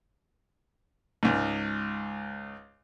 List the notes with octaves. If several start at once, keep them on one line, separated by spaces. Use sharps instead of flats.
C#2 G#2